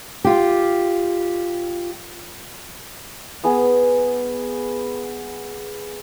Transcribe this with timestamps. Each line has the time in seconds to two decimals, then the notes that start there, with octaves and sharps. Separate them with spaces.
0.24 F4 G4
3.44 B3 G#4 G#5 B5